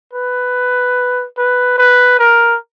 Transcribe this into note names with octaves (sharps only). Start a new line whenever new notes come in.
B4
B4
B4
A#4